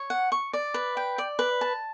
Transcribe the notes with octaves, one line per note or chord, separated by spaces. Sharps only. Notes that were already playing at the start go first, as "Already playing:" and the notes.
Already playing: C#5
F#5
C#6
D5
B4
G5
D5
B4
A5